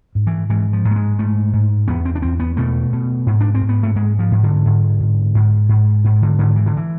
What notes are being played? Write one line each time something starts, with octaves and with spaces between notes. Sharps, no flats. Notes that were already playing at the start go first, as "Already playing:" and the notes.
G#2
E3
G#2 E3
F3
G#2
A3
G#3
G#2 A3
G#2
E2 B3
C4
D4
E2 C4
B3
B2 A3
B2
G#2
D4
C4
G#2
B3
A3
G#2 G#3
F3
G#2
D3
G#2
G#2
G#2
G#2
G#2
D3
G#2 D3
E3
D3
E3